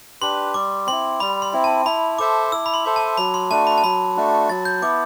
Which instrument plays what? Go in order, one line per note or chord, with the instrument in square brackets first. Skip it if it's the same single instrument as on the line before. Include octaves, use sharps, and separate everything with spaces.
[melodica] D4 G4 B4 [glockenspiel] C6
[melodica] G3 [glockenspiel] D6
[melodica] C4 E4 [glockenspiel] C6
[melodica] G3 [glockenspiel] B5
[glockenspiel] C6
[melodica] C4 E4
[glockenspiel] A5
[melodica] E4 [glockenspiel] B5
[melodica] A4 C5 E5 [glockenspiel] D6
[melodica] E4 [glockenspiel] E6
[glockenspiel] B5
C6
[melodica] A4 C5 E5
[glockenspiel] A5
[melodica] F#3 [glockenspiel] B5
[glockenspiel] C6
[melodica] A3 D4 F#4 [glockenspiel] A5
[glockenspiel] B5
A5
[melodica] F#3 [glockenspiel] B5
[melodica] A3 D4 F#4
[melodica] F#3 [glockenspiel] A6
[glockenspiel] G6
[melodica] B3 E4 [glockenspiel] D6